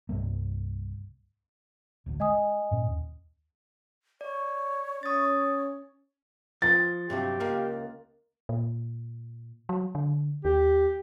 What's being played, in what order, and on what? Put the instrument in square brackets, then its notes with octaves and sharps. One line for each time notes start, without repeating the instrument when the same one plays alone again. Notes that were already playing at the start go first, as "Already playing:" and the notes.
[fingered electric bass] C2 G2 G3 A#3
[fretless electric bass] D1 A1 D2
[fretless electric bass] G#3 [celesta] D#5 G#5 D#6
[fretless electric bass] G2 A#2 C#4
D#2
[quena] C#5 [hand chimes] D5
[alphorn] C#4 [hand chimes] D#6 A6
[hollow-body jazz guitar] F3 [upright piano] A6
[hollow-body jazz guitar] G2 C3 F#3 [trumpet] G4
[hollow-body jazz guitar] C#2 A#3 F5 [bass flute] A#4
[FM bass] A#2
F#3
D3
[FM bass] D#2 [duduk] G4